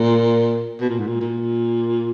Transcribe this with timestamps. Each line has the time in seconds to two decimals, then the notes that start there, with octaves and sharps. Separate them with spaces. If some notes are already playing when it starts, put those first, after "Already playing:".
Already playing: A#2
0.81 B2
0.89 A#2
0.98 G#2
1.08 A#2
1.21 A#2